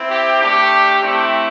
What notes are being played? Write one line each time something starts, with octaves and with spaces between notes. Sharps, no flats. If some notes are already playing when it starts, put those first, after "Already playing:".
Already playing: C4 E4
G4
A3 D4 G4
A3 C4 E4 G4